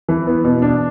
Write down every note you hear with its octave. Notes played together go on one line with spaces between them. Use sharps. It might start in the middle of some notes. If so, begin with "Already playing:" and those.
E3
B3
B2
D4